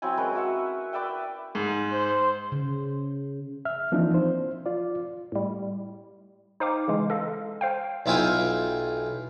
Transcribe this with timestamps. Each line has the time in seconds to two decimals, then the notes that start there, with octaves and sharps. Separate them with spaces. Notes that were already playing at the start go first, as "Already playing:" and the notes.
0.02 F#3 C4 E4 G#5
0.17 G#3 C#4 A#4 B4
0.35 F#4 E5 F#5
0.93 B4 D5 E5 G5
1.55 G#2
1.92 C5
2.52 C#3
3.65 E5 F6
3.92 E3 F3 A#3 C4 D4 D#4
4.14 C5
4.66 F4 D5
5.32 A2 G3
6.60 D#4 C5 F5 G5 D6
6.88 C#3 E3 G#3
7.10 A4 D#5 F5
7.61 C5 F5 G5
8.06 B1 E4 F4 G5 G#5